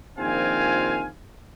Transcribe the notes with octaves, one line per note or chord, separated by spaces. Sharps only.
A#1 D#3 C4 F4 F5 G#5